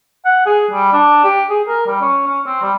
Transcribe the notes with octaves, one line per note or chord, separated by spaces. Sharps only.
F#5
G#4
G3
D4
G4
G#4
A#4
G3
C#4
C#4
C4
G3